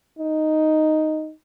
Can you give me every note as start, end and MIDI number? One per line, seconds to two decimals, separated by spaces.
0.19 1.32 63